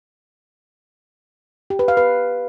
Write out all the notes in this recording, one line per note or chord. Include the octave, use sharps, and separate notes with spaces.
G4
B4
F5
B4